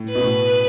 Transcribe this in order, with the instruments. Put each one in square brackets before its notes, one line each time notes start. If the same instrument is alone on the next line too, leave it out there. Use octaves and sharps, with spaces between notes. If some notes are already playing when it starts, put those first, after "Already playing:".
Already playing: [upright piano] A2
[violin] B4
[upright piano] B2
A2